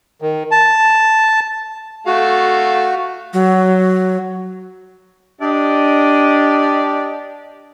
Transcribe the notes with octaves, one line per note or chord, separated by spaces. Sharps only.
D#3
A5
A3 F#4 F5
F#3
D4 G4 D#5